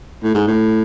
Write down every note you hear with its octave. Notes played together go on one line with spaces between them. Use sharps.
A2
G#2
A2